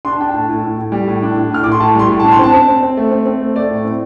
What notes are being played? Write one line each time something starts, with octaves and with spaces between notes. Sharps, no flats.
D4 C6
A5
D4 G5
A2 A5
A2
A2
A2
G3
A2
D4
A2
A2 F6
A2 D6
C6
A2 A5
G3 C6
A2
D4 A5
C6
C4 A5
C4
C4
C4
A3
C4
C4
A3
A3 D5
A2
C4